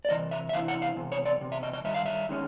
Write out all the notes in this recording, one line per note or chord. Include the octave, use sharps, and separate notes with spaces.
D5
C3 E3 D#5
E5
E5
C3 E3 E4 F5
F#5
F5
E2 C3
C#5
D5
E2 C3
E5
D#5
D#5
G2 D#3 E5
F5
E5
D#3 G#3 C#4